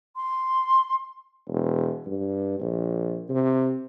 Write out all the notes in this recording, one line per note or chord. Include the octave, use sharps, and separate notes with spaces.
C6
E1
G2
A#1
C3